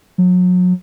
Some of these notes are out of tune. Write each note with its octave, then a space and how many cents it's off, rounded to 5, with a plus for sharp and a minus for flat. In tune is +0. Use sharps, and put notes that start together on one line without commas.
F#3 -35